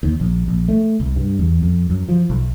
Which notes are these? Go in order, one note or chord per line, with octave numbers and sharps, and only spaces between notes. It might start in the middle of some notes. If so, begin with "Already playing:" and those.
D#2
A#1
A#1
A3
C2
G2
E2
F2
F#2
F3
B1